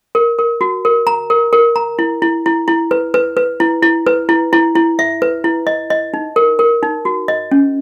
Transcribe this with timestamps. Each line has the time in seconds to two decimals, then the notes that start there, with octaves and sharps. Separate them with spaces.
0.15 A#4
0.39 A#4
0.61 F#4
0.85 A#4
1.07 A#5
1.30 A#4
1.53 A#4
1.76 A#5
1.99 E4
2.22 E4
2.46 E4
2.68 E4
2.91 B4
3.14 B4
3.37 B4
3.60 E4
3.83 E4
4.07 B4
4.29 E4
4.53 E4
4.75 E4
4.99 E5
5.22 B4
5.44 E4
5.67 D#5
5.90 D#5
6.14 D#4
6.36 A#4
6.59 A#4
6.83 D#4
7.05 F#4
7.28 D#5
7.51 C#4